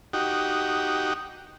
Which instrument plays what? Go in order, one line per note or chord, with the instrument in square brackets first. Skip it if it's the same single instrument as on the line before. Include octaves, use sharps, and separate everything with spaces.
[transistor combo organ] D#4 F#4 G4